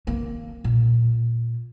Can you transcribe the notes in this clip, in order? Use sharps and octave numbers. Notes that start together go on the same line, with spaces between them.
D#3 A#3
A#2